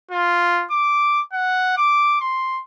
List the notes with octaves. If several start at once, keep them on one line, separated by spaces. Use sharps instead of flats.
F4
D6
F#5
D6
C6